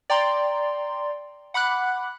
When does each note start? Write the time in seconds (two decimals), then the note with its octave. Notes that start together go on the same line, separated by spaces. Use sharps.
0.10 D5 G5 A#5 C6
1.54 F#5 B5 D6 F#6